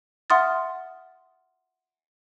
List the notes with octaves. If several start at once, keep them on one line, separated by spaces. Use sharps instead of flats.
E5 F#5 C6 D#6 F6 A6